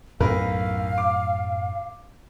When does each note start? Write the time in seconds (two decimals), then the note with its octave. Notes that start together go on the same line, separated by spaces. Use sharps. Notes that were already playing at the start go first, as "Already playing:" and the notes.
0.20 B1 F#2 A2 F#3 A#4 B4 F5
0.98 D6